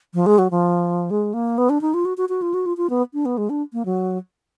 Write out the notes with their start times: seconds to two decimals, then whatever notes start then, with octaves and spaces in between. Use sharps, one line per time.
0.14 F3
0.26 G#3
0.38 F#3
0.51 F3
1.11 G#3
1.34 A#3
1.58 B3
1.69 D4
1.81 D#4
1.94 F4
2.05 F#4
2.17 F#4
2.29 F#4
2.42 F4
2.54 F#4
2.66 F4
2.77 F4
2.90 B3
3.13 D4
3.25 B3
3.38 G#3
3.50 D4
3.73 A#3
3.85 F#3